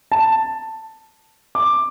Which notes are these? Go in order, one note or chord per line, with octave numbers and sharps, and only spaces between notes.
A5
D6